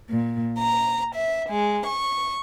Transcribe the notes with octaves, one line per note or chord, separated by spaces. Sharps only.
A#2
A#5
E5
G#3
C#6